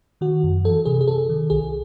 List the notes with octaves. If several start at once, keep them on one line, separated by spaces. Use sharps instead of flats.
D#3 F#4
F#2
E3 A4
C3 G#4
G#4
C3 A4
D#3
C2 G#4